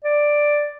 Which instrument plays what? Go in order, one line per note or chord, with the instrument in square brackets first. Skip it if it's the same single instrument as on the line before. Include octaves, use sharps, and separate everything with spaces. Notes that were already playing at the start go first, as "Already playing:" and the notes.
[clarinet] D5